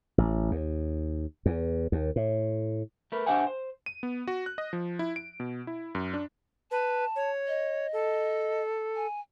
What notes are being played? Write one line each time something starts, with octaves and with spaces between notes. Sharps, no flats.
A1
D#2
E2
D#2
A2
A3 A#4 B4
D4 G4 C5 E5 F#5 G#5
C5
D#7
B3
F#4
F#6
D#5
F3
E4
D7
B2
E4
F#2
D4
B4 A5
C#5
D#5
A4
G#5